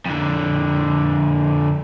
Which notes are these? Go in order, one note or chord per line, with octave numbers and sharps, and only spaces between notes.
F2 D3